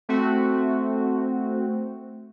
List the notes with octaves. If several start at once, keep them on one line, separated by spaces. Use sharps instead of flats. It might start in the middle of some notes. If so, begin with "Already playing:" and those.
A3 C4 F#4